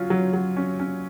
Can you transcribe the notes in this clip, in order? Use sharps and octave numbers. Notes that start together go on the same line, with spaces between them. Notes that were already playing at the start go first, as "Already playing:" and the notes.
Already playing: F#3 C#4 F4
F#3
F#3
C#4
C#4